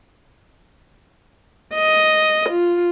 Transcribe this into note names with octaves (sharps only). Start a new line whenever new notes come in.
D#5
F4